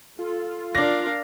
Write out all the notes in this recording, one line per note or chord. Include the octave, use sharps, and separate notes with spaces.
F4 A4
D4 A#4 D5 F5 A#6